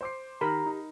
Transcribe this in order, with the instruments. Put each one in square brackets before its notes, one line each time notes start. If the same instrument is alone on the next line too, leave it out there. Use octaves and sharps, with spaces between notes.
[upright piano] C5 D6 C7
[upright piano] D#3 [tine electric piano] G4 [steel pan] A#4 B5 [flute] A#5
[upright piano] D#4